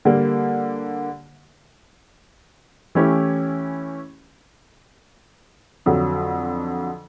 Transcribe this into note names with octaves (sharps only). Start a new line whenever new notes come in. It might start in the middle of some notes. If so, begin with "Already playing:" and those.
D3 G3 A#3
E3 A3 C#4 E4 G4
F2 D3 F#3